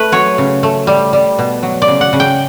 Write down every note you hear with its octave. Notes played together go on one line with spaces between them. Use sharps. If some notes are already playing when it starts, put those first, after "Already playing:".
Already playing: A3 B4
F#3 C#5
C#3
A3
G3
G3
B2
F#3
D5
C#3
F#5
C#3
G5